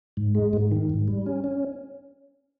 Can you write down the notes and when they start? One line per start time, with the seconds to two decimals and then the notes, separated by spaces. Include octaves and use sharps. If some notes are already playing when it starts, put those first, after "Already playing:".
0.17 G#2
0.35 G#3
0.53 G#2
0.72 D#3
0.90 G#2
1.08 G3
1.26 C#4
1.44 C#4